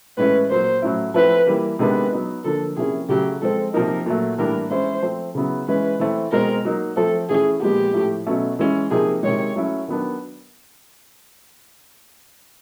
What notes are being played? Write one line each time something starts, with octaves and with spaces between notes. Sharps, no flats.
A2 E3 G#3 C#4 E4 B4
A#2 F#3 A#3 C5
A2 F#3 A3 C#4 E4
F3 A3 C4 E4 B4
E3 G3 A#3
C3 D#3 G#3 B3 D4 B4
F#3 B3 D#4
D3 F3 A#3 D4 A4
C3 F3 A#3 C#4 E4 G#4
C#3 F#3 A3 G4
F3 G#3 C4 A4
C3 F3 A#3 D#4 A#4
A#2 F#3 A3
A2 E3 G3 A#3 D4 A#4
E3 G#3 C#4 E4 C5
F3 A3 C4
C#3 F#3 B3 E4
E3 G#3 C#4 E4 B4
E3 A3 C4
B2 G#3 C4 A#4
F#3 A#3 D#4
F3 A3 C4 A4
E3 A3 C#4 E4 G#4
A#2 F3 G#3 B3 G4
A2 F3 A3
B2 F#3 A3 C#4
E3 G#3 C#4 E4
C3 F3 A#3 D#4 G#4
C3 D#3 G#3 C#5
F#3 A3 C#4 E4
D#3 F#3 B3 D4